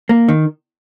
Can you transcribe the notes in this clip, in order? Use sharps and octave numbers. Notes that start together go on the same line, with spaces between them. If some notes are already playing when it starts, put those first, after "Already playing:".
A#3
D#3